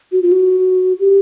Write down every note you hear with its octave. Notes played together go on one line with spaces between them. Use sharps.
F#4
F4
F#4
G4